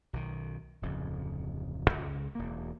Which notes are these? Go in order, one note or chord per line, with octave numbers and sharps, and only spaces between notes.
B1 D#3
D1 F2 C#3
C#2
E1 A#3